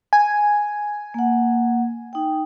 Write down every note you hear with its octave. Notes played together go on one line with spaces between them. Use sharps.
G#5
A#3 F#5
D#4 G5